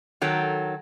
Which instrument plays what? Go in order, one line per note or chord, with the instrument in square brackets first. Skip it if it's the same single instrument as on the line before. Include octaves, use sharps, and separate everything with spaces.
[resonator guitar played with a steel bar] D#3 F#3 A4